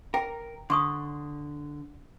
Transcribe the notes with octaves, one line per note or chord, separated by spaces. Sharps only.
A#4 G5
D3 C6 C#6 D#6